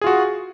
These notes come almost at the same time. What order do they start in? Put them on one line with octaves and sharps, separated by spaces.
G#4 F4 F#4